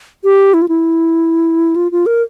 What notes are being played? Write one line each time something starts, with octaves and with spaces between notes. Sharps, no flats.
G4
E4
F4
E4
F4
F4
A#4